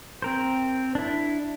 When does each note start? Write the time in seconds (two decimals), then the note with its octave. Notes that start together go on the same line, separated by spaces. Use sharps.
0.22 C4 A#4 C5
0.95 D4 E4